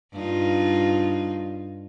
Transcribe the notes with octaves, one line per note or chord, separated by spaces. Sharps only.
G2 D#4 F4